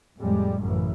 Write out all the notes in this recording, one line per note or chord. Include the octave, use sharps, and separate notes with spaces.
F2 A2 G3 G#3
A1 F#2 A2 C#3 E3